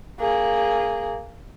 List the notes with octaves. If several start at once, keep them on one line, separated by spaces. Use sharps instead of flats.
A#3 G#4